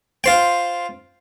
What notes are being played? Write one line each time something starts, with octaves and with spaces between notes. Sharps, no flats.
F4 C5 G5